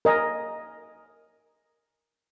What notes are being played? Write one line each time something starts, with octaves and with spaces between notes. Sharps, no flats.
A#4 D#5 G#5